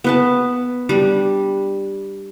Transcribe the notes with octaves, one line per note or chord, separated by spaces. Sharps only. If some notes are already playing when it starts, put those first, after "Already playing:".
B3 B4 A5
G3 D4